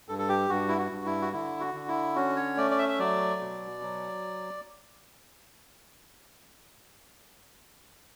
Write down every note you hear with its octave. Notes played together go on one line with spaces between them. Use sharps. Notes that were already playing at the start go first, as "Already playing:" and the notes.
G2 A4
A4
G4
G2 F#4
E4
F#4
G2
E4
F#4
D3 E4
F#4
D3
E4
C#4 F#4
C#5
A3 D5
D5
E5
E5
F#3 D5
B2
F#3